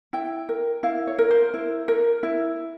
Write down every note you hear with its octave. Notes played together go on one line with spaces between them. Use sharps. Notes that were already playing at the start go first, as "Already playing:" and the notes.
E4 G5
A#4
E4 F5
C#5
A#4
C5
E4
A#4
E4